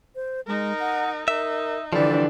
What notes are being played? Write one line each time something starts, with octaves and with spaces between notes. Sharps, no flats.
C5
G#3 D#4 A#4
F#5
D#4 A#4 E5
D3 E3 F3 G3 D4 A4 D5